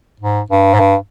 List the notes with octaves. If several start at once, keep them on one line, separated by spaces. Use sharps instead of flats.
G#2
G2
G#2
G2